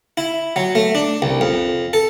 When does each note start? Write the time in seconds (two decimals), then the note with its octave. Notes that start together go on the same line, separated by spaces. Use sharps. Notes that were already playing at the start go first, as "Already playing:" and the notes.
0.17 E4
0.56 F#3
0.75 A3
0.95 D4
1.22 C2
1.41 F2
1.93 A4